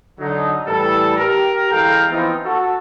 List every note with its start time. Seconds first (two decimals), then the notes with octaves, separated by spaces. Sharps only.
0.18 D3 F#3 D#4
0.66 A2 E3 G3 A4
1.16 G4 A#4
1.69 E3 G#3 A4 F5 G5 A#5
2.08 E3 F3 B3 C4 D#4 F4
2.43 F#4 A4